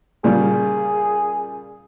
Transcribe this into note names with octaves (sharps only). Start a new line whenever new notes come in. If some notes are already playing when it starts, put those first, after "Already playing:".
A#2 C#3 G3 G#4